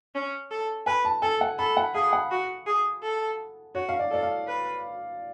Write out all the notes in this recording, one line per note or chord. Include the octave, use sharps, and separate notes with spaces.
C#4
A4
B4 G#5
A5
A4 G#5
F#5
A4 B5
F#5
G#4 F5
F#5
F#4
G#4
A4
F#4 C#5
F5
D5
A4 D5
F5
B4